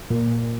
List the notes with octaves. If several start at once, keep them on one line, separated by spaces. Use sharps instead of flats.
A#2